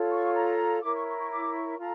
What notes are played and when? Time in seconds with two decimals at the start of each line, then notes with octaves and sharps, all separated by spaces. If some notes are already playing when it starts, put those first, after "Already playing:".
Already playing: F4 A4 C#5
0.10 C#6
0.34 A#5
0.82 E4 A#4 C#5 D6
0.94 C#6
1.07 C#6
1.19 C#6
1.30 D6
1.55 C#6
1.79 F4 A4 A#5